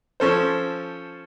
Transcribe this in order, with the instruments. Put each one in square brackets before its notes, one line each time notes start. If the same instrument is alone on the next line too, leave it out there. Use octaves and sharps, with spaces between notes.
[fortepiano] F3 C#4 A4 C5